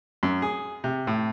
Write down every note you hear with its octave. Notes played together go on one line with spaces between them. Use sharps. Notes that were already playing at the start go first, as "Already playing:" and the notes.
F#2
G#4
C3
A2